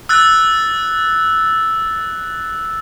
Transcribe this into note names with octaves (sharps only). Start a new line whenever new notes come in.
E6 F#6 A6